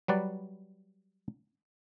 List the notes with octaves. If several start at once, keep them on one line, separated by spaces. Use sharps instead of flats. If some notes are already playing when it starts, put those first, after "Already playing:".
F#3 G3 B4 D5